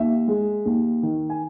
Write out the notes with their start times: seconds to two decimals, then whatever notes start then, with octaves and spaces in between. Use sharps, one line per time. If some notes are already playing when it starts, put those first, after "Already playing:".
Already playing: D#2 E5
0.28 G#3
0.65 D#2
1.03 D#3
1.30 G#5